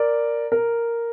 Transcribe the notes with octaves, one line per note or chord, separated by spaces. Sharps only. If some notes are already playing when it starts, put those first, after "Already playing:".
Already playing: A#4 D5
A#4